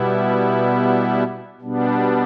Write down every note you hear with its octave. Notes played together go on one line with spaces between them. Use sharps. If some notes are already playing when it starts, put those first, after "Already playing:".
Already playing: B2 G3 B3 E4
B2 G3 B3 D4